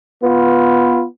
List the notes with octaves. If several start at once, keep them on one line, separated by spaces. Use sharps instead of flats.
B3 F4 B4